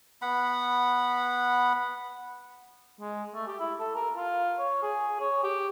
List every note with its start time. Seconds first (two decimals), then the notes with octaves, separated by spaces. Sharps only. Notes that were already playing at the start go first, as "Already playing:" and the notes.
0.22 B3 F#5 B5
3.01 G#3
3.34 A3
3.47 G4
3.60 E4
3.80 A4
3.95 A#4
4.17 F4
4.59 C#5
4.82 G#4
5.20 C#5
5.43 G4